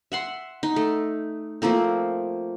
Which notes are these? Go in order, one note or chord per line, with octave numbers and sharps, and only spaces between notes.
E5 F#5 C6
D#4
A3
F3 A3 A#3 C4